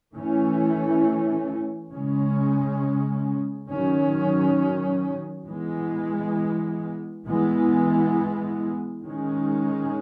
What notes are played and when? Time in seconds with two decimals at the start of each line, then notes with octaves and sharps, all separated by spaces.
0.13 E3 A3 C#4
1.92 C#3 G#3 C#4
3.70 D#3 F#3 C#4
5.47 E3 G#3 B3
7.26 E3 G#3 B3
9.03 D#3 G#3 C#4